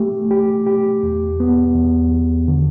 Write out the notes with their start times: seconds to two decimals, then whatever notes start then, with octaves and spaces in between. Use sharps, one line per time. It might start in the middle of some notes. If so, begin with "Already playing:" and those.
Already playing: A3 G4
0.31 G4
0.66 G4
1.03 E2
1.40 B3
1.75 E2
2.12 E2
2.48 D3